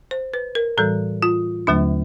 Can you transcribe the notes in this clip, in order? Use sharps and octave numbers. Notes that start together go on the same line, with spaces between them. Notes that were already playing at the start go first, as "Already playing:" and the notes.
C5
B4
A#4
A2 E3 G3 A4
F4
D#2 D3 F#3 A3 D4